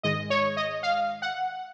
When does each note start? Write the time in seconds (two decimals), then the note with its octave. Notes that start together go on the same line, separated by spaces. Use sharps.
0.03 G#2 D#3 G#3 D#5
0.30 C#5
0.57 D#5
0.83 F5
1.22 F#5